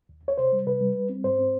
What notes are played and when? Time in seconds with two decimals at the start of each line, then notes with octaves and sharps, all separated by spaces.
0.09 D#2
0.24 D#2 C#5
0.38 C3 C5
0.52 G3
0.67 C3 B4
0.81 G3
0.96 G3
1.09 C4
1.24 G#2 C5
1.39 C4